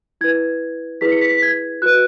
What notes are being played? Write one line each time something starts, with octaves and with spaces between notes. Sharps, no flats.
E4 B4 G#6
E4 G#4 B4 B6
C#7
B6
B6
G#6
F#4 B4 F#6